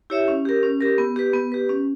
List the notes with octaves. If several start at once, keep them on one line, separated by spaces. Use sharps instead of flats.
E4 G4 C#5 E5
C#4
G4 A#4
C#4
G4 A#4
B3
G4 B4
B3
G4 B4
C#4